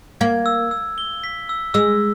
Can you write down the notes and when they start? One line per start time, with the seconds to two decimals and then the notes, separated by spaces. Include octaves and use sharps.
0.21 A#3 G#6
0.46 E6
0.71 E6
0.98 G7
1.24 B6
1.49 E6
1.74 G#3 E6